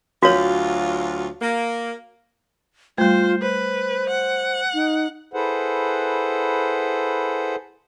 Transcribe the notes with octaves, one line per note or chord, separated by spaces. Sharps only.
D2 F#3 F4 F#4 C#5
A#3
G3 A3 F4 C5
B4 C5
F#5
D#4
E4 G#4 A4 B4 C5 F#5